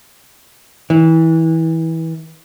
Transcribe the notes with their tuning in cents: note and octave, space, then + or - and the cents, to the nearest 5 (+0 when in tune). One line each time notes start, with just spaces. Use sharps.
E3 -25